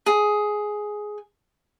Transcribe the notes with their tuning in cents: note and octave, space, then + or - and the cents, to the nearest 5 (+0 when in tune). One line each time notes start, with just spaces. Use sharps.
G#4 +10